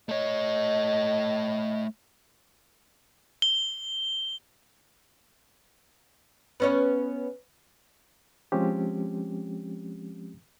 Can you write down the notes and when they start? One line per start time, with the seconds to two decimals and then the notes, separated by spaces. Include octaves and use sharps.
0.09 A3 C#5 D#5
3.42 G7
6.60 B3 C#4 C#5
8.52 F3 G#3 C4 C#4 G4